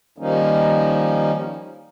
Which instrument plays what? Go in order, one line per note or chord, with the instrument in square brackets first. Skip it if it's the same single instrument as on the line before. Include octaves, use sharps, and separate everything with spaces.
[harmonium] D#3 F3 G3 A#3 C#4 D#4